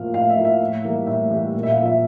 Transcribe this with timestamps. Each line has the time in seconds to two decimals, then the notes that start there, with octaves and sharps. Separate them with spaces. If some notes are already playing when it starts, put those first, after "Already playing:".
Already playing: A2 F3 A#3 F5
0.14 A2 F5
0.30 E5
0.37 F3 A#3
0.45 E5
0.61 A2
0.84 E3 G3 A#3
1.07 A2 E5
1.30 E3 G3 A#3
1.54 A#2
1.63 E5
1.70 F5
1.78 F3 A#3
1.85 E5